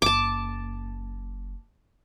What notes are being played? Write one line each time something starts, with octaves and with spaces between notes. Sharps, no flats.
F#1 A5 D6